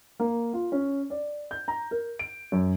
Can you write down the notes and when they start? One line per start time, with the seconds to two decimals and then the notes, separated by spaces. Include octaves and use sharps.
0.20 A#3
0.53 F4
0.72 C#4
1.10 D5
1.51 G6
1.68 A#5
1.91 A#4
2.19 D7
2.52 F#2